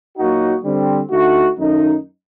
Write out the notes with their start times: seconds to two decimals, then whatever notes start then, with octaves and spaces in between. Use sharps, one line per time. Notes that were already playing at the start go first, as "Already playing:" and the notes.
0.18 A#2 F#3 A#3 D#4 F#4
0.64 D3 G3 C4
1.10 D3 A3 D#4 F#4
1.57 F#2 D#3 A3 D#4